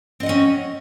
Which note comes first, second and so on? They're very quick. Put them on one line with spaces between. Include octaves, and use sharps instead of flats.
C4 D#5 F#5 C#4